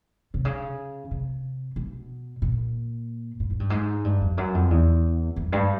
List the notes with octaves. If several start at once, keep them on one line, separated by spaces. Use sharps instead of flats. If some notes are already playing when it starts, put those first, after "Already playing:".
C3
C#3
C3
B2
A#2
A2
G#2
G2
G#2
G2
F2
F#2
F2
E2
F2
G2